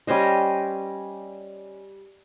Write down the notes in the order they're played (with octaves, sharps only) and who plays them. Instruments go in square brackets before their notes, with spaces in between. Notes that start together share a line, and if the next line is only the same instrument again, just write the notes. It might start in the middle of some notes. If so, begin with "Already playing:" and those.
[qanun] G3 C#4 C5 D#5